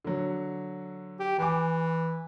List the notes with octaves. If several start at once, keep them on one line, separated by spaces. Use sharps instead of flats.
D3 F#3
G4
E3 G#5 D6